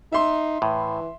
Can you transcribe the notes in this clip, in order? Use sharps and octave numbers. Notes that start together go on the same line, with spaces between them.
D#4 E5 C6
A2 E3